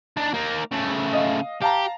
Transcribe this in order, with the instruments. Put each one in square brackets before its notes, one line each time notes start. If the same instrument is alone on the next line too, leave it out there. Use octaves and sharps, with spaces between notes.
[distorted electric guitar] D4 D#4
A#3 D#4
C#3 A3
[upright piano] D#5 F5
[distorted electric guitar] G4 [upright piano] F5 A5 A#5